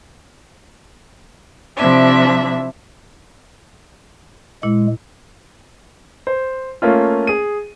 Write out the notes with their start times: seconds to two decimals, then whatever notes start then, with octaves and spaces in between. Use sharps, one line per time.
1.77 C3 F3 D4 E4 E5
4.63 A#2 G#3 E4
6.27 C5
6.82 A3 A#3 C#4 F4
7.27 G#4 D#7